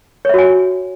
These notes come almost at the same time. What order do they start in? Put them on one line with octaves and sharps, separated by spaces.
C#5 E5 F#4 G#5